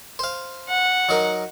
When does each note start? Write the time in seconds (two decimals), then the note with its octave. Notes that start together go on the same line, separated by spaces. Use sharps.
0.19 C5 F5
0.69 F#5
1.09 F#3 D#4 A#4